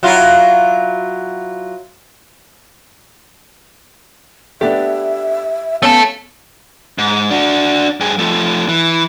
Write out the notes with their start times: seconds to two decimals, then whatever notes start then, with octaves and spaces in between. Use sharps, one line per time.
0.03 F#3 E4 F4
4.61 A3 B3 D4 G4 E5
5.83 A3 B3 C#4 A4 F5
6.98 G#2
7.31 D4 F#4
8.00 G2 G#4
8.19 F3 A3
8.68 E3